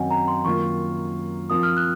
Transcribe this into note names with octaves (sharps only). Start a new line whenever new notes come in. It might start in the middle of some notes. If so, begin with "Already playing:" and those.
Already playing: F#2 D#3 F#3 C4 D#5 F#5 G#5
A#5
C6
F#2 D#3 A#3 F4 A#4 C#6
F3 C4 F4 A#4 D#6
F6
F#6